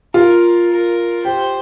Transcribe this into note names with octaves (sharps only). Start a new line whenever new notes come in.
F4 A#4
A#4
G4 C5